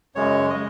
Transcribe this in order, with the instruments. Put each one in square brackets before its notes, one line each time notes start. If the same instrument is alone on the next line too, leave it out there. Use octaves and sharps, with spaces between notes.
[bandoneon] F#2 C#3 G#3 C#5
C#3 G#3 D#5